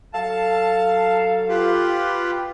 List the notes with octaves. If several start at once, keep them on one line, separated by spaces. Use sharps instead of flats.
F#3 A4 F5 A5
F4 G4 B4